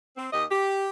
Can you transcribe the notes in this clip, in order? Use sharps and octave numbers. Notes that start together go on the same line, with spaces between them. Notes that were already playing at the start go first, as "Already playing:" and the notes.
C4
D#2 G4 D#5
G4